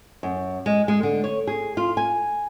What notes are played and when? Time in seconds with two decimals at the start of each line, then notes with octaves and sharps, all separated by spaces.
0.23 F#2
0.66 G#3
0.88 G#3
1.03 D3
1.24 C#5
1.47 G#4
1.77 F4
1.97 G#5